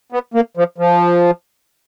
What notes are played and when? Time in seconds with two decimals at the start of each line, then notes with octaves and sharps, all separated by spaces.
0.12 B3
0.34 A#3
0.57 F3
0.78 F3